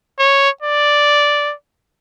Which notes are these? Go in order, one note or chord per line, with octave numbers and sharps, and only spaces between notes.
C#5
D5